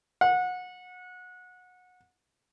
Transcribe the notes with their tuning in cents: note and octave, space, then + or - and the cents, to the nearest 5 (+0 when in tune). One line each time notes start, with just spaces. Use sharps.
F#5 -25